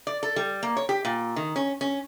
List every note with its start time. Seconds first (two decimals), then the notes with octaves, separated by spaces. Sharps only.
0.07 D5
0.23 A4
0.36 G3
0.63 A#3
0.77 C#5
0.89 G4
1.05 A#2
1.36 D#3
1.56 C#4
1.81 C#4